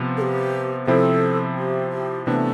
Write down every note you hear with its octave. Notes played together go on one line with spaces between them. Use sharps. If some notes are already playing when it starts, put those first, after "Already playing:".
Already playing: C3 F3 B3 F4
A4
G4
C3 F3 C4 E4 A4
G4
G4
C3 E3 A3 B3 D4